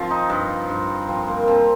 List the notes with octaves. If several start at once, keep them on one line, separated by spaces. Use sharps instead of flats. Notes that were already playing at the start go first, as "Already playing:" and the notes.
Already playing: F3 C4 F4
D#4
G2
G2
F3 C4
A#3
F3 C4